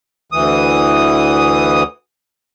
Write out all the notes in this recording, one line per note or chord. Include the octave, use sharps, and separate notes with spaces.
D2 E3 D#6